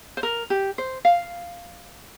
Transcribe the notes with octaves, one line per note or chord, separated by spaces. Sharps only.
C5
A#4
G4
C5
F5